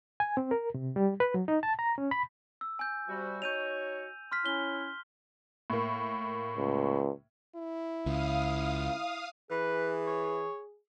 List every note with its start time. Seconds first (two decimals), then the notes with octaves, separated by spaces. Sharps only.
0.20 G#5
0.37 C4
0.51 A#4
0.74 C3
0.96 G3
1.20 B4
1.34 F#3
1.48 D#4
1.63 A5
1.79 A#5
1.98 C#4
2.11 B5
2.61 E6
2.79 G#5 G6
3.08 C3 G3 F#4
3.42 D#4 F#4 C#5 G6 D#7 F7
4.32 C6 F6 B6
4.45 C#4 E4 F6 G7
5.70 A2 A#3
6.57 C#2
7.56 E4
8.06 C#2 F5 D#6
9.51 E3 G#4 B4
10.07 C#5